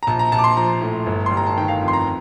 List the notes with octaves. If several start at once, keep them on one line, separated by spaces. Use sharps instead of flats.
A#5
A#1 A5
A#5
A#1 A5
D6
C6
F3 A#5
A2
G1
G3 C6
A#5
A5
D#3 G5
F5
F2
C6
A#5